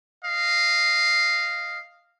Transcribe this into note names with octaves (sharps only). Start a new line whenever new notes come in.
D#5 F5